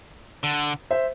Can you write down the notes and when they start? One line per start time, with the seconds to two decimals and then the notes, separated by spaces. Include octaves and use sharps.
0.43 D3
0.90 C5 E5